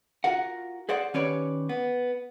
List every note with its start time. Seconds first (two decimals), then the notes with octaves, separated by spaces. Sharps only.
0.24 F4 F#4 A#4 F#5
0.89 G#4 C5 D5 F#5
1.14 D#3 C#4 G4 B4 C#5 D5
1.69 B3